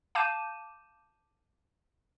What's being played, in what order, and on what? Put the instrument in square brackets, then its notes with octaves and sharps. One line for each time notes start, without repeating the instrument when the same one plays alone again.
[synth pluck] F5 A5 D6 G6 D#7 E7